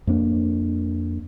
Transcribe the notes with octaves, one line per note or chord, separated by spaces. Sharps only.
F2 A#3 D4